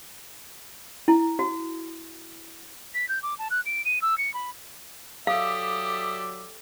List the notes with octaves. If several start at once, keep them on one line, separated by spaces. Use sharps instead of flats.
E4
F#4
B6
G6
D6
A5
F#6
D7
D#7
E6
C#7
B5
F#3 G4 A4 D5 E5 F5 D#6